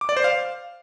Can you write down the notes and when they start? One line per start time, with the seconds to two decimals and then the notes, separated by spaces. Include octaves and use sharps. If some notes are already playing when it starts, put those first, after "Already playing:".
0.01 D6
0.09 D5
0.17 C5
0.24 F5